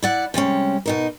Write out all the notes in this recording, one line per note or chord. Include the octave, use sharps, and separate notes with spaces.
E4 D5 F#5
C3 G3 G#3 C#4
B2 D#4 A#4